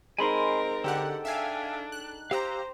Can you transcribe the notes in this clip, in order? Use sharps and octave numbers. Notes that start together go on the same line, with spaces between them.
G#3 C4 D#4 A#4 G#5 B5 C6
D3 G4 A4 F#5 G5
D4 E5 F5 G#5
F#6
G4 C5 F5 A#5 E6 F#6